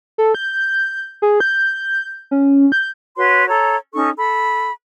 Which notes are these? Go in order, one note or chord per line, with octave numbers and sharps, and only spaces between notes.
A4
G6
G#4
G6
C#4
G6
F#4 B4 C#5 C6
A4 C#5 A#5
C#4 D#4 A4 C#6
A4 B5